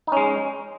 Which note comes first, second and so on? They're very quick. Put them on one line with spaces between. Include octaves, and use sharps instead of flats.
D#4 C#4 G#3